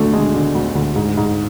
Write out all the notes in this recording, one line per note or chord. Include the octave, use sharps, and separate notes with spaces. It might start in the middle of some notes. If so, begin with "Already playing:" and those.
Already playing: D2 D3 F#3 A3 D4
D3 G#3
D3
D2
D2
G#2
G#2